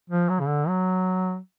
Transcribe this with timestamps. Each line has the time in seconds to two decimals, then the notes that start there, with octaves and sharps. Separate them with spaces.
0.10 F3
0.30 F#3
0.40 C#3
0.48 D3
0.68 F#3